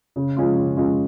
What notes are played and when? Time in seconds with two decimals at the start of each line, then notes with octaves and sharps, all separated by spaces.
0.16 C#3
0.36 F3 G#3 C#4 F4
0.56 C#3
0.77 F3 G#3 C#4 F4